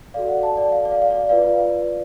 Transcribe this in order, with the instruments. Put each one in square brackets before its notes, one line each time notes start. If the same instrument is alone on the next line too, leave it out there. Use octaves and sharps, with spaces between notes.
[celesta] F#4 A4 D5 F5
F#5
A5
D5
F5
D5
F5
F5
D5
F4 B4 D5 F5